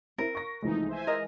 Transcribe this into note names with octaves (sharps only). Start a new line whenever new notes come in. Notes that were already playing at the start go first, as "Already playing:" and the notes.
C4 E4 A#4
C#6 A#6
C2 E3 F3 G#3 A3 D#4
C5 E5 G#5
A#4 D#5